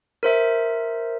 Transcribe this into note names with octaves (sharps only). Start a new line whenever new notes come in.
A#4 C5 E5